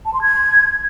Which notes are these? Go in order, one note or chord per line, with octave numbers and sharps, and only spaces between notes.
A5
C6
G#6